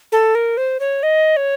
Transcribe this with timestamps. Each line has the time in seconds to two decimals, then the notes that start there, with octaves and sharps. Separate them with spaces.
0.12 A4
0.35 A#4
0.57 C5
0.80 C#5
1.03 D#5
1.37 C#5